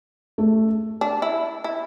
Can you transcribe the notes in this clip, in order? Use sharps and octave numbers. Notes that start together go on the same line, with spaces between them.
A3
D4
E4
E4